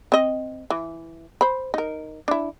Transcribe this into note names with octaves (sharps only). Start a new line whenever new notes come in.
C4 D#5
E3
C5 B5
D#4 A#4
D4 E4